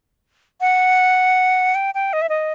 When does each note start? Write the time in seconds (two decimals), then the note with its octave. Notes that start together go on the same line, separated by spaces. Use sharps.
0.61 F#5
1.75 G5
1.95 G5
2.13 D#5
2.22 E5
2.29 D#5